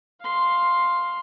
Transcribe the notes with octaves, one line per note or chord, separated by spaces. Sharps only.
F5 C6